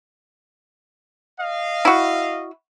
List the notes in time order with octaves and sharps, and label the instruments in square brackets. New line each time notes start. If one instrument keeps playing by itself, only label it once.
[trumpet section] D#5 F5
[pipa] E4 F#4